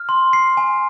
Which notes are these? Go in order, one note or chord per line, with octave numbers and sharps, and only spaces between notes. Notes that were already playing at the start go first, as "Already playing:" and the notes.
Already playing: F6
C6
C7
G#5